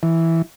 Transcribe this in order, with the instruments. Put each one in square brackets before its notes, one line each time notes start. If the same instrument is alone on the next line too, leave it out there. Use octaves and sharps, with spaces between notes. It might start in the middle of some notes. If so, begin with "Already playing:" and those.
[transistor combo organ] E3